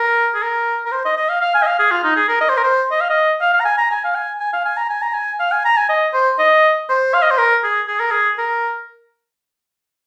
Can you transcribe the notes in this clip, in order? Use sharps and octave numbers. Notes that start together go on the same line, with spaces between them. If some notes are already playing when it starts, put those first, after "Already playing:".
Already playing: A#4
G#4
A#4
A#4
C5
D#5
D#5
F5
F5
G#5
D#5
F5
G#4
F4
D#4
G#4
A#4
D#5
C5
A#4
C5
D#5
F5
D#5
F5
F5
A#5
G#5
A#5
G#5
F5
G#5
G#5
F5
G#5
A#5
G#5
A#5
G#5
F5
G#5
A#5
G#5
D#5
C5
D#5
C5
F5
D#5
C5
A#4
G#4
G#4
A#4
G#4
A#4